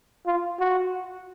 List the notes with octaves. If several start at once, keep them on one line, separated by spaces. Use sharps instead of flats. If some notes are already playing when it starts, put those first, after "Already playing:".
F4
F#4